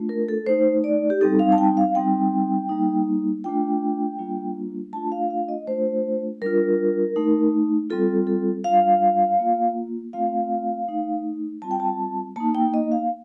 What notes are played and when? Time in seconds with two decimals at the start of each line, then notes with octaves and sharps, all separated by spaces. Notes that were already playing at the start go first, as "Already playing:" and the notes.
Already playing: A3 D4 F4
0.09 A#4
0.28 A4
0.46 A3 D#4 C5
0.84 D5
1.10 G4
1.21 G3 C4 D#4 A4
1.39 F5
1.52 A5
1.58 G5
1.77 F5
1.95 G3 C4 D#4 G5
2.69 G3 A#3 D#4
3.44 A3 D4 F4 G5
4.19 G3 A#3 D4 F4
4.93 A3 D4 F4 A5
5.12 F5
5.30 F5
5.49 D#5
5.67 A3 D4 F4 C5
6.42 G3 D4 F4 A#4
7.16 A3 D#4
7.90 G3 C4 F4 A4
8.27 A4
8.64 G3 D4 F4 F5
9.39 A#3 F4
10.13 A3 C4 F4 F5
10.88 A3 D#4
11.62 G3 C4 F4 A5
11.71 G5
11.80 A5
12.36 A#3 D#4 A5
12.55 G5
12.74 D#5
12.92 F5